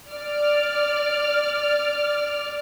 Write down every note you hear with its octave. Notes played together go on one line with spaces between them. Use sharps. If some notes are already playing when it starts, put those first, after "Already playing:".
D5 F6